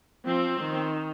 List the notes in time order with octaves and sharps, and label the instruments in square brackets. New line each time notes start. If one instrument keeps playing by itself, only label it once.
[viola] F3 [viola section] C4
[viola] D#3